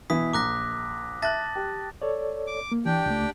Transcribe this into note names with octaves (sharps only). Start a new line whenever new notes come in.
B2 E3 E4 D#6 B6
A#1 A#5 D6 F#6 A#6
E5 A5 F#6 A6 A#6
G4
A4 C#5 D5
D6
A#3
E3 D4 G4 G5
C#2 A3